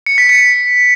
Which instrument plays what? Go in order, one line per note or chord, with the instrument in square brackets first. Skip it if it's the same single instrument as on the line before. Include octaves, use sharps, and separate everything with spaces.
[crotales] C#7
B6
C#7